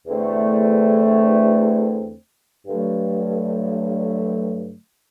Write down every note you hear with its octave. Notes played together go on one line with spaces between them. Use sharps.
E2 D3 A3 C4
G2 D3 F#3 A3